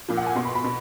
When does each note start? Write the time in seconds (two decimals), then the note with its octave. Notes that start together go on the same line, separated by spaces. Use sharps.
0.08 A#2 F3
0.17 F#5
0.26 G#5
0.35 B2 C6
0.45 B5
0.55 B5
0.64 B2